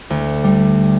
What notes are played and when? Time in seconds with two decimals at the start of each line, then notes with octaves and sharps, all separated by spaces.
0.10 D2
0.44 G3